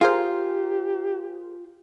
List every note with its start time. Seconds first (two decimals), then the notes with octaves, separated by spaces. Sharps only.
0.01 F4 G4 G#4 A#4 C5